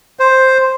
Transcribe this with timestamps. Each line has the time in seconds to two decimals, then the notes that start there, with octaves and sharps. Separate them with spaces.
0.19 C5